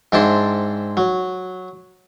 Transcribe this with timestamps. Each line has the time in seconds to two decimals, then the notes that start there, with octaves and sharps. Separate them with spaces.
0.12 G#2 C4 D4 E4 A5 C6
0.97 F#3